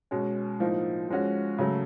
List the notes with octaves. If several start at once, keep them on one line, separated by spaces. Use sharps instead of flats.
B2 G#3 C#4
A2 F3 A#3 D#4
F3 G#3 C#4 F#4
C#3 F#3 A3